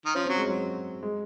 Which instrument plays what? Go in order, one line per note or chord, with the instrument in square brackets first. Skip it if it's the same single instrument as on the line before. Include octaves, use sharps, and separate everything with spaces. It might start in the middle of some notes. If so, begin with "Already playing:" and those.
[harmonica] D#3
[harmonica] F3 [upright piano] C#4
[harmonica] F#3 [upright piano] C4
[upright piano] G#3
F#3
G#3